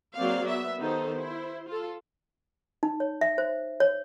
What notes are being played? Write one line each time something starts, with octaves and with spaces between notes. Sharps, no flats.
F#3 A#3 C4 G#4 D5 F5
B3 E5
D#3 B3 D#4 G4 A4 C5
E4 C5
F4 A4
D#4
C#5
E5
C5
C#5